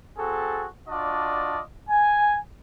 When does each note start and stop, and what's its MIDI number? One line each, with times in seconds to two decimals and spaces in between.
0.18 0.66 60
0.18 0.66 66
0.18 0.66 68
0.18 0.66 69
0.88 1.60 62
0.88 1.60 65
0.88 1.60 66
0.88 1.60 74
0.88 1.60 75
0.88 1.60 81
1.89 2.38 80